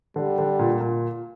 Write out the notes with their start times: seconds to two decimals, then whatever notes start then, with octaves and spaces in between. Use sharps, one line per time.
0.16 D3 G3
0.38 D3
0.59 A#2
0.81 A#2